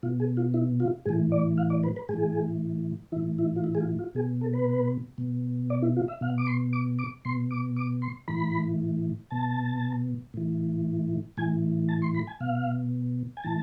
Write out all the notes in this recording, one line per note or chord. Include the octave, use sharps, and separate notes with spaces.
B2 F4
G#4
F4
E4
F4
A2 E3 G#4
D5
F5
D5
B4
B4
A2 E3 G#4
A2 E3 E4
E4
F4
E4
G#4
F4
F4
B2 G#4
A4
B4
B2
D5
E4
F4
E5
B2 F5
D6
C6
D6
D6
B2 C6
D6
D6
C6
A2 E3 B5
B2 A5
A2 E3
A2 E3 G#5
A5
C6
B5
G#5
B2 F5
G#5
A2 E3 A5